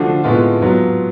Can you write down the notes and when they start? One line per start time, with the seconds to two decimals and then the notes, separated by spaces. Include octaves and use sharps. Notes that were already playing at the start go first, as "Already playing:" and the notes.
Already playing: D3 F3 A3 D4 F#4
0.24 A2 G#3 B3 F4
0.60 G#2 F#3 B3 F4